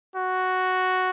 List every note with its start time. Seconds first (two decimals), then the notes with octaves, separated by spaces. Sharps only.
0.16 F#4